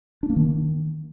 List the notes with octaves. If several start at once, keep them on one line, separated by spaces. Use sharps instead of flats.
D4
A#3
D#3